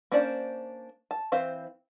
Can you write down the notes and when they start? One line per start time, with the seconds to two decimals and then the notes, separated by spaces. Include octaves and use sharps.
0.12 A#3 C#4 D4 C5 D5
1.11 A5
1.32 E3 C4 C5 F5